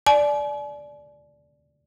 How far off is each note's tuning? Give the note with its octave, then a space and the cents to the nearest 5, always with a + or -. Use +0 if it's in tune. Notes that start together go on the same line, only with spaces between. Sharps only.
D5 -5 G#5 +45